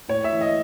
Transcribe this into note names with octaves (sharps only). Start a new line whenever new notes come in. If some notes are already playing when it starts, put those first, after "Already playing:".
A2 C#5
E5
E3
D#5